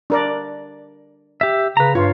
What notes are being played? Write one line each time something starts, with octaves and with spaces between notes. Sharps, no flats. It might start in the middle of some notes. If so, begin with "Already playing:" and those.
D4 A#4 D5
G4 E5
C#3 B4 A#5
G2 F4 C#5